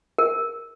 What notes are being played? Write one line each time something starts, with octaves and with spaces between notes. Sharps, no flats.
A#4